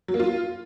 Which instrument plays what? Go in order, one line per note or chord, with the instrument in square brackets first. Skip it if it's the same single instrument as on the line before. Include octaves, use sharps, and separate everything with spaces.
[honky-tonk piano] F#3
A#3
F4